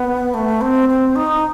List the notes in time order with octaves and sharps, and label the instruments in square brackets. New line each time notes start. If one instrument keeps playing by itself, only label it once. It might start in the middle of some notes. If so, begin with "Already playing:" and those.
Already playing: [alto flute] B3
A3
C4
C4
D#4